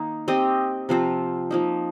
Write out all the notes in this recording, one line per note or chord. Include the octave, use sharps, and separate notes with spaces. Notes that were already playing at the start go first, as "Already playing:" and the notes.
Already playing: D#3 A#3 D#4
C4 G4 D#5
C3 F3 C4 F4
F3 A#3 D#4